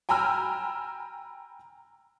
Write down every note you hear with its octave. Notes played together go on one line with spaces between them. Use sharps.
G5 G#5 A#5 B5 E6 F6